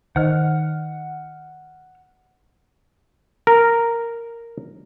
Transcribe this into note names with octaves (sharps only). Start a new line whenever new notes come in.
D#3 C5 D#5 F#5 F6
A#4